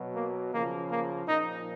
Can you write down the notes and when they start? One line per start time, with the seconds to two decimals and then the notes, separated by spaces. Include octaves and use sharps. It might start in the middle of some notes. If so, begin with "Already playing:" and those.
Already playing: B2 F#3
0.14 A#3
0.51 C#3 F3 A#3
0.88 A#3
1.26 A#2 F3 D#4